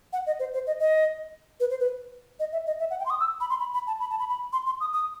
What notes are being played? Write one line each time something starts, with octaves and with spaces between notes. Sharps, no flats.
F#5
D#5
C5
C5
D#5
D#5
B4
C5
B4
D#5
E5
D#5
E5
F#5
G5
C6
D#6
E6
B5
C6
B5
B5
A5
B5
A5
B5
B5
C6
C6
D#6
D#6